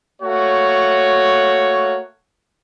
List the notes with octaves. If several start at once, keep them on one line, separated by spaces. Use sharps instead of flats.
A3 A#3 F#4 C#5